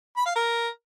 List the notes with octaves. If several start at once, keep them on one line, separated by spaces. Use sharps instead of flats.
B5
F5
A#4